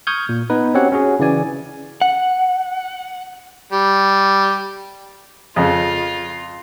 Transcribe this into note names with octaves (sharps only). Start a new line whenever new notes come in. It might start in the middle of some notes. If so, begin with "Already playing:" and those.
C#6 D#6 F6 G6 G#6
A#2
B3 D#4 B4
C4 C#4 F#4 G4 C#5 F#5
C#4 F#4 G#4
C#3 E3 D5 G#5
F#5
G3
F2 C#3 F4